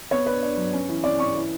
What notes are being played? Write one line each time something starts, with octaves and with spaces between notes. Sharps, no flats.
B3 C#5
D4 B4
D4
F#3
C#4
E3
C#4 D5
C#4 C#6
E3